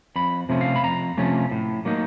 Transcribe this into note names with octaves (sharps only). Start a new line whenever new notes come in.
F2 B5
C3 F3 A3 C#4
F5
B5
F2 A#5
C3 F3 A3 C#4
A2
F#3 A#3 D#4